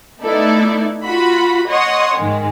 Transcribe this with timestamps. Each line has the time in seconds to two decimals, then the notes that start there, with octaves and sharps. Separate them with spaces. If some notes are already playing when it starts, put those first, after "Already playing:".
0.21 A3 B3 D#4 E4 A4 D5
1.05 F4 F#4 B5
1.69 C#5 D#5 F#5 C6 C#6 D#6
2.16 G#2 D#3 G#3